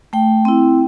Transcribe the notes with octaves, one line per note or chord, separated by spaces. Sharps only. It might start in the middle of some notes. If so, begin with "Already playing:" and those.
A3 G5
C4 E4